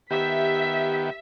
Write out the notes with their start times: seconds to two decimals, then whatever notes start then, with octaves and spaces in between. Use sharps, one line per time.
0.11 D#3 B3 G4 E5 G5 B6